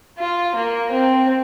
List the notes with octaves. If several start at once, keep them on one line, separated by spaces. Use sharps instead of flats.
F4
A#3
C4